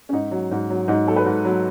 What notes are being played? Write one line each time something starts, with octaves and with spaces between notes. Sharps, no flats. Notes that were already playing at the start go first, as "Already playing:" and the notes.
C#4
G#2 D#4
F#3
G#2
F#3
G#2 D#4
F#3 A4
B4
G#2
F#3